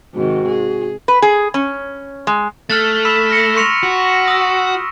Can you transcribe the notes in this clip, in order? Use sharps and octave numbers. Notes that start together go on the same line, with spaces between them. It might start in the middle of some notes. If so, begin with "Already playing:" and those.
G#2 C3 D#3 F#4
G#4
B4
G#4
C#4
G#3
A3 F6 F#6 A6
B5 E6 B6 E7
F6 A#6 C#7
C6 C#6 A#6 C#7 E7 F7
F#4
D#6 E6